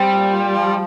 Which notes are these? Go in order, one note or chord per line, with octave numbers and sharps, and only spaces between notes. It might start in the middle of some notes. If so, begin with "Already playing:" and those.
Already playing: G3 C4
A#2
F4
F3